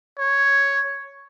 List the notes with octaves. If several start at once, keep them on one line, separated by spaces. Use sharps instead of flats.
C#5